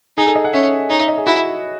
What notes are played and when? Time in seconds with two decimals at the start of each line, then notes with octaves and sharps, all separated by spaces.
0.17 D#4 G#4
0.26 A4
0.35 D#5
0.44 F#5
0.53 C#4 E5
0.90 D#4 C#5
1.00 E5
1.08 D#5
1.18 G#4
1.26 E4 F#4